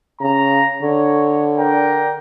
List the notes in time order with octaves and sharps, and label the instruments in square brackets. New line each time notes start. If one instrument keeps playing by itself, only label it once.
[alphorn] C#3 [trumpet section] A#5
[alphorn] D3 [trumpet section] C#5
[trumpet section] D4 A#4 G5